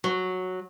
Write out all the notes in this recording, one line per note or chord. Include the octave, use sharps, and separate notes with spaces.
F#3